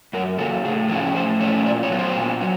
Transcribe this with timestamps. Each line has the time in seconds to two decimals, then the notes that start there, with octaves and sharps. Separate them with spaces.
0.13 F#2 A#4
0.39 C#3 F#3 A#3 A4
0.65 A2 G#4
0.89 F3 A3 C#4 E4 G#4
1.15 A2 C5
1.40 F3 A3 C#4 E4 C#5
1.66 A#2 D5
1.83 C#5
1.91 F#3 B3
1.99 C5
2.17 A#2
2.41 F#3